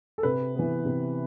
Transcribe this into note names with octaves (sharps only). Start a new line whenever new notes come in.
A4
C3 B4
E3 B3
C3